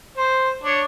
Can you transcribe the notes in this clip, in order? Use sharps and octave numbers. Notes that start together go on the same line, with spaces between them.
C5
D4 C#5